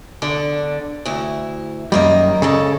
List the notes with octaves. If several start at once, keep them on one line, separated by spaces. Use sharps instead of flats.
E2 D3 D4
D2 E4
F#2 D#3 G3 A#3 D#5
A#2 C#3 G#3 A4